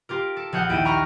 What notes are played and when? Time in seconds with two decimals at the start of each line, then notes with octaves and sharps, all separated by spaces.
0.09 F4 G4 A#4
0.37 A4
0.52 A#1 G#4 A#4 F#5 G6
0.69 D#2 E4 G5 D#7
0.85 A#5 B5 C#6 F6